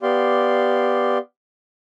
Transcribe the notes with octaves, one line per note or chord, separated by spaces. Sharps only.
B3 G4 D5 F5 C6